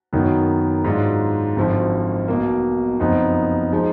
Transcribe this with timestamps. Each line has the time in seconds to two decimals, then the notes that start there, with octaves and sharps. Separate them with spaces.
0.13 F#1 F#2 D#3 F#3 B3
0.84 G#2 F#3 D4 F4
1.56 G#1 F#2 D3 F3
2.28 B1 B2 A#3
3.00 F#1 F2 F3 B3 D#4
3.72 F3 G#3 D#4